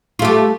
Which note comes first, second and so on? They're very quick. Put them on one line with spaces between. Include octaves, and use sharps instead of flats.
F4 A3 G4